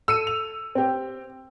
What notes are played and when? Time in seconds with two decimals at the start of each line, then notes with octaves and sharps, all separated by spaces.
0.08 A4 E6 C#7 D#7
0.27 F7
0.75 C4 G4